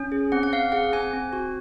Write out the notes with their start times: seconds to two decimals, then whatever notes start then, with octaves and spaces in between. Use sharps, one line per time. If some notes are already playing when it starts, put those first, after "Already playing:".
Already playing: C#4
0.12 G#4
0.32 C4 F#5
0.43 F#5
0.52 C4 F5
0.72 G#4 F#5
0.93 C4 G#5
1.13 C4
1.33 F#4